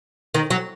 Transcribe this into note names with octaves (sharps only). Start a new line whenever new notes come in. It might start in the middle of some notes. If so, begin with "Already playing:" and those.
D#3
F#3